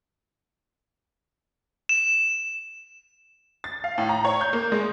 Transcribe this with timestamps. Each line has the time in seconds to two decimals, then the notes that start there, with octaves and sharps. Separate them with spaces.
1.89 E7
3.64 A6
3.84 F5
3.98 A2
4.09 A#5
4.25 C#5
4.41 G6
4.53 A#3
4.72 G#3